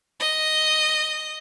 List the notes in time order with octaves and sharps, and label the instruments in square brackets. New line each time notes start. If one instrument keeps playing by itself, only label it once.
[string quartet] D#5